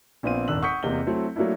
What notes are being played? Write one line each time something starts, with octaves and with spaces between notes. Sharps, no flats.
A#1 A#2 B3 C4 F5 D#7
D#1 G#1 D4 E6 F#6 F#7
F#5 C#6 D#6 G6 B6 C#7
E2 C3 A#3 D#5 G7
F#3 A3 C4 E4
F#3 A3 A#3 D4 E4